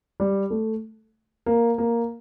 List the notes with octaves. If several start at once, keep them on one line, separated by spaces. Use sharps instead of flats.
G3
A3
A#3
A#3